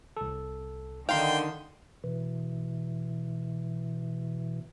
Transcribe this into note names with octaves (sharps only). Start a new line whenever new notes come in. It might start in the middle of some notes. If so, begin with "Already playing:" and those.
C2 A4
D3 D#3 D#4 F5 G5 C6 G6
B2 E3